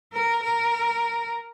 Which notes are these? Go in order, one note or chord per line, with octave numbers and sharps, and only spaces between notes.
A#4
A#4